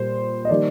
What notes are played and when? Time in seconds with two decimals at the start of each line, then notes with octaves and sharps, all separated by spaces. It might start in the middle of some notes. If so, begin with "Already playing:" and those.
Already playing: A#2 G3 A#3 C5
0.45 D#5
0.49 D#3 G3 A#3 D5